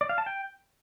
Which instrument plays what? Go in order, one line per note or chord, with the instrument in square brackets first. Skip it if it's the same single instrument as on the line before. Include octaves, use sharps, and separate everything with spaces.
[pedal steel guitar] D5
F5
A5
G5